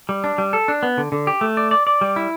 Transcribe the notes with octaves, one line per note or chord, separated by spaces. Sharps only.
G3
D4
G3
A4
D4
B3
D3
D3
G4
A3
D5
D5
D5
G3
E4